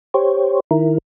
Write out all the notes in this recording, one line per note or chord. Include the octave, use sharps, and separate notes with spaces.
G4 C5 C#5
D#3 E4 A#4